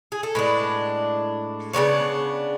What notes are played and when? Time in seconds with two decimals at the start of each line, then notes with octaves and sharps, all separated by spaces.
0.12 G#4
0.23 A4
0.35 A2 G#3 D4 B4
1.73 C#3 G#3 B3 D4 C#5